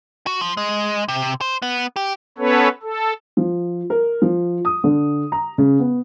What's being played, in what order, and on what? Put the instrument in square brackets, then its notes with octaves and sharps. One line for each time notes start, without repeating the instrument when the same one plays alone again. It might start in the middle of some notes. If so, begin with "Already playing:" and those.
[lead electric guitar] F#4
F3
G#3
C3
C5
B3
G4
[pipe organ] B3 C#4 A4 B4 C#5
A4
[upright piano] F3
A#4
F3
D#6
D3
A#5
C#3
B3